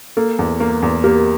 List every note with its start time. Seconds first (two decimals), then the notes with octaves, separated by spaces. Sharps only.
0.17 A#3 A4
0.39 E2
0.60 A#3
0.82 E2
1.04 A#3 G4 A#4